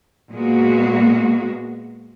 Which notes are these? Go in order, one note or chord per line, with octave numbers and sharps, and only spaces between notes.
A#2 G#3 A#3 B3 F#4